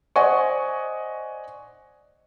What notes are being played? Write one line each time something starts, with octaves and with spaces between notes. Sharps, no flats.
C5 D5 D#5 F#5 G#5 C#6